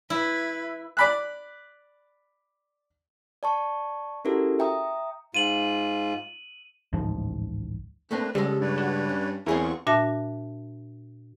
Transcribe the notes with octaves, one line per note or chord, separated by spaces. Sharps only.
E4 B4
D5 B5 F#6
D5 A5 C#6
C#4 E4 F#4 G4 A4 A#4
E5 G5 A#5 D#6
G#2 F4 D#7 F#7
A1 D2 G#2 F3
A3 A#3 C4 D4 B4
C#3 F3 G3 G#3 A4
G2 B4 C#5 D5
F#4
C#4
E2 F#3 C4 E4 F4 G#4 A#4 C#6
A#2 D4 F#4 E5 A5 A#6